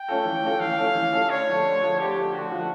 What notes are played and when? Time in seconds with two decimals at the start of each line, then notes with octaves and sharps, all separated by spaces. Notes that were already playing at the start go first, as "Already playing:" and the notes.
Already playing: G5
0.08 A3 C#4 F4 A4
0.25 E3
0.42 A3 C#4 F4 A4
0.60 E3 F5
0.78 A3 C#4 F4 A4
0.95 E3
1.12 A3 C#4 F4 A4
1.29 D3 C#5
1.47 F3 A3
1.65 D3
1.82 F3 A3
1.99 D3 G4
2.16 F3 A3
2.34 D3 F#4
2.51 F3 A3